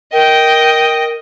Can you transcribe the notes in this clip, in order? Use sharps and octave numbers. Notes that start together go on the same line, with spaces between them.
A#4 D#5 G5